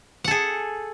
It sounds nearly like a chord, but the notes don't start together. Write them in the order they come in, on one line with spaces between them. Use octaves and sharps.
F#5 A4 G#4